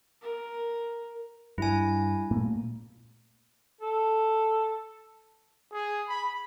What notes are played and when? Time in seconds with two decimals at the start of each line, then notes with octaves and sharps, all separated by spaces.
0.22 A#4
1.58 G2 E4 G#5
2.31 A#2 A3 A#3
3.81 A4
5.72 G#4
6.08 B5